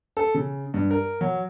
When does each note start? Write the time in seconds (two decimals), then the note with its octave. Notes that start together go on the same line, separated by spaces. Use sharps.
0.17 A4
0.34 C#3
0.74 G2
0.91 A#4
1.21 F#3